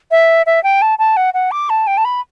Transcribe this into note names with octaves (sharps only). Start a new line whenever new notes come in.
E5
E5
G5
A5
A5
F#5
F#5
D6
A5
G5
A5
B5